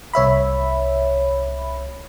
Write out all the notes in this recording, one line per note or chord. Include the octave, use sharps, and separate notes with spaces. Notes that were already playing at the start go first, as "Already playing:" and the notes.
C2 C#5 E5 B5